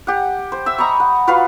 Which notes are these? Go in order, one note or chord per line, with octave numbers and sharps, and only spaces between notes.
G4 F#5
C5
E5 E6
D#5 A#5 B5 C#6
F#5
F4 F#4 B4 F5